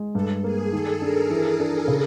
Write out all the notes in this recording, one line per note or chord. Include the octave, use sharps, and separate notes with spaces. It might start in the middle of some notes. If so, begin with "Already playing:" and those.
Already playing: G#3
G2 A4
A#3 G#4
D#3 A4
D4 A#4
E3
D4
C#3